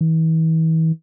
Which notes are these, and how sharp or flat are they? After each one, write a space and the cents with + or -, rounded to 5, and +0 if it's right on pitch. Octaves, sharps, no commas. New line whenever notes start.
E3 -40